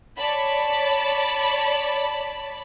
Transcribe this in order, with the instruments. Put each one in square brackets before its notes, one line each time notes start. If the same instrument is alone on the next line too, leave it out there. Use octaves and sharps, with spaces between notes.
[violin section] C#5 D5 A5 B5